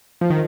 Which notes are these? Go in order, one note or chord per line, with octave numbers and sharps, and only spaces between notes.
F3
D#3